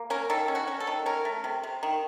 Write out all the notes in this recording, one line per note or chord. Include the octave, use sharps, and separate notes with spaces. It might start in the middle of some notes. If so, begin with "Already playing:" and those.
Already playing: A#3
C#4 A#4
D#3 A4
C#4
F#4
C#4
A4
D#3
C#4 A#4
A3
C3
C3
D#3